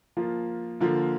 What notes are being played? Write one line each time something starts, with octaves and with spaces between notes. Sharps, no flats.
F3 A#3 F4
D3 F3 A#3 F4